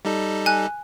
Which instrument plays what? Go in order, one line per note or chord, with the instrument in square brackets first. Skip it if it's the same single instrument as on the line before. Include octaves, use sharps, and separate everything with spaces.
[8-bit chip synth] G3 D#4 A4
[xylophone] G#5 F#6